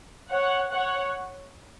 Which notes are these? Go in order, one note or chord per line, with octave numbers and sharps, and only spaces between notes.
C#5 F#5
C#5 F#5